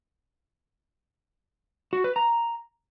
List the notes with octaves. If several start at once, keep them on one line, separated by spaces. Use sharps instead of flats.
F#4
B4
A#5